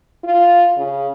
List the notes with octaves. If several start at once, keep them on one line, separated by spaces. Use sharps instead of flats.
F4
C#3